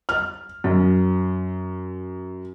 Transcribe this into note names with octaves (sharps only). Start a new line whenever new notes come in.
F6
F#2